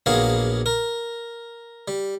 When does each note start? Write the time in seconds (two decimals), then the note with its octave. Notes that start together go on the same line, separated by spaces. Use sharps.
0.06 A#1 F#3 A#3 B3 G#4 F5
0.66 A#4
1.88 G3